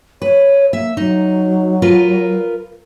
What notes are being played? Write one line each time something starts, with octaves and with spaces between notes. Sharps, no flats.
B4 C#5
A#3 E5
F#3 D#4
F4 A#4 B4